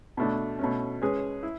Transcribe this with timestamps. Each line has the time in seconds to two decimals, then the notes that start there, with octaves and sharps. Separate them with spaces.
0.17 B2 A3 D4
0.59 B2 A3 C#4
1.02 G#3 C#4 G#4 B4
1.43 E4